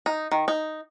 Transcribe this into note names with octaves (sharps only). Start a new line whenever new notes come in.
D#4
D#3
D#4